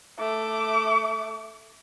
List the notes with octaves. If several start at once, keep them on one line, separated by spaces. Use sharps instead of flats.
A3 D6